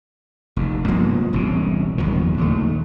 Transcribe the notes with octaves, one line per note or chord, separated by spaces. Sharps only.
F1 D#2
G2 F3 A#3 B3
E1 C2 A2 C#3
F#1 E2 D#3 F3
A#1 D#2 F3 A3